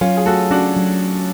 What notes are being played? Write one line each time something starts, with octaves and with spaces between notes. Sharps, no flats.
F#3 C#4 F4
G#4
A3 F#4 A4
C#4 D4 F#4
F#3